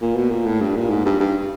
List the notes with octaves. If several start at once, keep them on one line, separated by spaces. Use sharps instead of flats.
A#2
B2
A#2
A2
G2
A#2
G#2
G2
G2